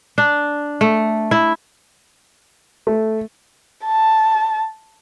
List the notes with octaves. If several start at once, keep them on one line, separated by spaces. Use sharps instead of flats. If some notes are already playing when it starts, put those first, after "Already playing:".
D4
A3
E4
A3
A5